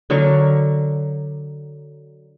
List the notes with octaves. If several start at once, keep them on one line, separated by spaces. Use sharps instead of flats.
D3 F#3 A#4 C#6